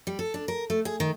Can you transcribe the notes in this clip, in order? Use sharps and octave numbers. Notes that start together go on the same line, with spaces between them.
G3
A4
D4
A#4
A3
G#4
D#3